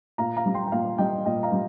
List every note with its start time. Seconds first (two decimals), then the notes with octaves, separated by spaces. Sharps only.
0.18 A#2 F5 A#5
0.37 F5 A#5
0.46 G3
0.54 G5 C6
0.67 G5
0.72 A#2 F5 A#5
0.98 G3 D#5 G5
1.25 A#2 D#5 G5
1.43 F5 A#5
1.52 G3